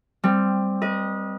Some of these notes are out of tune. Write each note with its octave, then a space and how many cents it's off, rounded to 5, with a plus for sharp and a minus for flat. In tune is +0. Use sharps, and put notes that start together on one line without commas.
G3 +5 C4 +0
B4 -40 D#5 +0